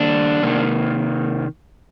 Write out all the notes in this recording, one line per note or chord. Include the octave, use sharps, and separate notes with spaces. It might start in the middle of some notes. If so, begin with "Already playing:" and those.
Already playing: D#3 G3 A#3 D4
C3 D#3 A#3